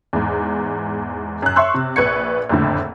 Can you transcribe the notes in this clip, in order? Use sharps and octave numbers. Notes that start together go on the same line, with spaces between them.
E2 G#2
F#2 F#6
E5 C6 C#6 E6 F#6
C3
A#1 B4 C#6 G#6 C#7
F#1 F2 A2 D3